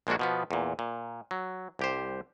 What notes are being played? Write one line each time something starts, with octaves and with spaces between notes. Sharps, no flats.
A#1 G#3 A#3 D4 F#4
B2 F3 B3
E2 A#2
A#2
F#3
C2 G4 C5